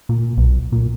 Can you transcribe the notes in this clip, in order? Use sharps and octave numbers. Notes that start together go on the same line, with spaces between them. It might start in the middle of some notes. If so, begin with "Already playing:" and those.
A#2
B1
A#2